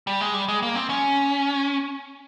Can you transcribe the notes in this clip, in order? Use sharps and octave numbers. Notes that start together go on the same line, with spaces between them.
G3
G#3
G3
G#3
A#3
C4
C#4